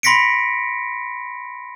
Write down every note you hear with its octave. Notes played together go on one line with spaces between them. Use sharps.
B5 C6 A#6 B6 C#7 D7